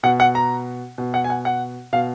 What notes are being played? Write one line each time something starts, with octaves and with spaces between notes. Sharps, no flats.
B2 F#5
F#5
A#5
B2
F#5
G#5
F#5
F#5
B2 F5